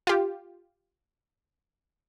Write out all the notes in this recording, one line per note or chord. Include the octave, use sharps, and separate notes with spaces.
F4 G4